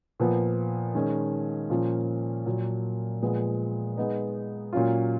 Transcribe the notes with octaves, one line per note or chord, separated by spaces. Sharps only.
A#2 F3 B3
D#3 G#3 C#4
A#2 F3 A#3 C#4 F4
A#2 F#3 A#3
A#2 F3 G#3 B3
G#3 B3 D#4
A#2 F#3 C#4 F4